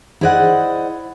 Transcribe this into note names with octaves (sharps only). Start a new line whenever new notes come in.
E4 G#4 C5 D5 D#5 F#5